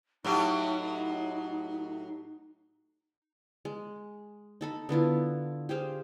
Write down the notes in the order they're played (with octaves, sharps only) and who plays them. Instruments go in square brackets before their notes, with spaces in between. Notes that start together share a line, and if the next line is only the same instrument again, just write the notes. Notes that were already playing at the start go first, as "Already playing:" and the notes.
[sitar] A2 F#3 G4 [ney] D#4
[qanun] G#3
D#4 A4 B5
D3 B3 E4 F4
G4 G#4 C5 F5